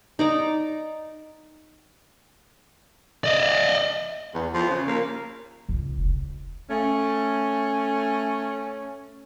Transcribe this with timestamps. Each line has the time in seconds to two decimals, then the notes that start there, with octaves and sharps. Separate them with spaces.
0.19 D#4 D5 A#5
3.24 D5 D#5
4.34 E2
4.54 F3
4.70 C#3
4.88 A#3
5.69 C#2
5.98 F1
6.70 A3 C#4